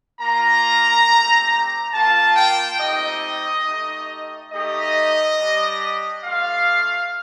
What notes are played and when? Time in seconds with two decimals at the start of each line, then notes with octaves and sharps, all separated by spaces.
0.20 A#3 F4 A#5
1.06 A3 C4 G4
1.93 A#3 F4 A5
2.35 G5
2.79 A3 C4 D#4 G4 D#5
3.66 A3 D#4 G4
4.51 A3 D#4 G4 D#5
5.37 G3 D4 G4
6.24 A3 D4 F4 F5